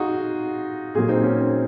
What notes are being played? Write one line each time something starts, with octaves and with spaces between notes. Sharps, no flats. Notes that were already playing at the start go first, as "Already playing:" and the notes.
Already playing: D#4 F4 F#4 G#4
A#2 F#3 A#3 F4 G#4
C4 D#4
C#4
C4